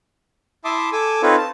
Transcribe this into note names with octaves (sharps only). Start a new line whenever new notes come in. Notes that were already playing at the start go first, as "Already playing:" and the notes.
E4 E5 A5 C6 D6 D#6
A4 G#5 D6 E6
C4 D#4 F4 A4 B4 C#5
A5